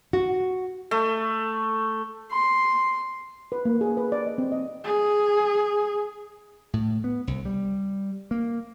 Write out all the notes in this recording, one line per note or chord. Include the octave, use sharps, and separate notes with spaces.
F#4
A3
C6
B4
A#3
G#4
B4
D5
D#5
C4
D#5
G#4
A2
B3
C2
G3
A#3